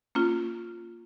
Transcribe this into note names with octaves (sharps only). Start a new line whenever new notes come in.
A#3 C#4 F4